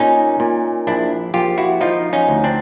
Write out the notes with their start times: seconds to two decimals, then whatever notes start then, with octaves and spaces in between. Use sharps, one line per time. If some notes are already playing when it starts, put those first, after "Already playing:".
Already playing: A#2 C#4 D#4
0.40 A#2
0.87 A#1 D4 E4
1.34 A#1 F4 G4
1.58 E4 F#4
1.81 F3 D#4 F4
2.13 C#4 D#4
2.28 D2
2.44 C4 D4